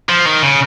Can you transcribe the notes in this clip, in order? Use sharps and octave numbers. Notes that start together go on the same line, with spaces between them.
F3
D#3
C#3